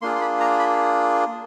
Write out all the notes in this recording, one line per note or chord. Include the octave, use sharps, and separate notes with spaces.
A#3 D4 F4 G#4 C6
C6
B5
A#5
B5